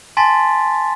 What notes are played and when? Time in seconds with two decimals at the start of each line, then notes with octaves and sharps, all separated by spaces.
0.17 G#5 A5 C6 A6 B6